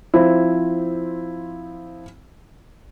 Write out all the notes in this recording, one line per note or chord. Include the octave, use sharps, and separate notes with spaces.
F3 C4 E4